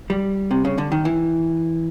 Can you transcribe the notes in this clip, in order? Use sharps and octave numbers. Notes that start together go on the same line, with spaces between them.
G3
C3
C#3
D3
D#3
E3